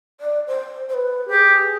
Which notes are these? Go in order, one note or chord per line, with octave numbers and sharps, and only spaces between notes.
D5
C5
C5
B4
G4 G#4